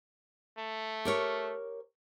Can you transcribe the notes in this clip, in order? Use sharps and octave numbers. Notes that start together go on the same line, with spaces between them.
A3
G4 A#4 C#5